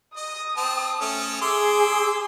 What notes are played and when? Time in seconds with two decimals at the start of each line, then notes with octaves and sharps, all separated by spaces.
0.17 D#5 D#6
0.57 C4 A5
1.01 A3 C#4
1.42 G#4 C6 D6 E6